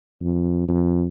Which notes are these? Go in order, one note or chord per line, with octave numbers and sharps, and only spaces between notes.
F2
F2